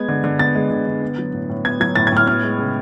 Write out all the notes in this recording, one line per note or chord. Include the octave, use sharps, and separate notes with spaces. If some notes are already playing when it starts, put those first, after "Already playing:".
Already playing: G#3 B3 G#6
D3
D3
B3 A6
G#3
D3
D3
B3
F#3
A2
A2
B3 G#6
F#3 G#6
A2 A6
G#6
A2 F6
B3 F6
G#3
C#3